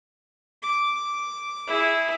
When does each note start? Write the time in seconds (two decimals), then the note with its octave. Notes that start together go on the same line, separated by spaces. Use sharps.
0.63 D6
1.67 E4 G#4